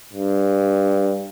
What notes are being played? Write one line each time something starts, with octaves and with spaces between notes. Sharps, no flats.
G2